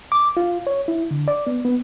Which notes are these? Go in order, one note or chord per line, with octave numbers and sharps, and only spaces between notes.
D6
F4
C#5
E4
D3
D5
B3
B3